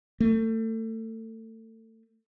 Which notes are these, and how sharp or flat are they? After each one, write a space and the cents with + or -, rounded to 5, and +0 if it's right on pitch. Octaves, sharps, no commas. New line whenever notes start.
A3 +30